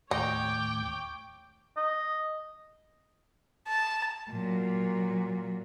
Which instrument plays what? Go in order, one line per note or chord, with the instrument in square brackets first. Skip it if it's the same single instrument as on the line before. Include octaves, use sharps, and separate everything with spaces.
[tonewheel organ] D#2 A2 [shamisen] D#4 [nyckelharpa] C#5 [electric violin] G5 D6
[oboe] D#5
[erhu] A5
[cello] A#2 F#3